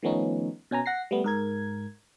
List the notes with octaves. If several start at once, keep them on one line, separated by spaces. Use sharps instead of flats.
D#3 F3 A3 B3 C#4 D#4
B2 C#4 G#5 A#5
F#5 A#6 C7
G3 A3 B3
G#2 A#4 G#6